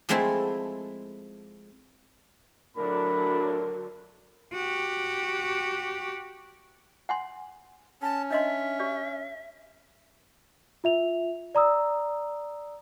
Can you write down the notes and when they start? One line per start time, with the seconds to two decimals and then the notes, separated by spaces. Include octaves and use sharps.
0.09 F3 G#3 A3 C4 E4 A4
2.77 A2 D3 F#3 D4 A#4 B5
4.53 F#4 G4
7.09 F#5 G#5 C6
8.02 C#4 A5
8.31 D4 D#5 E5 C6
8.79 G4 D5
10.84 F4 E5 F7
11.55 D5 A#5 D#6 E6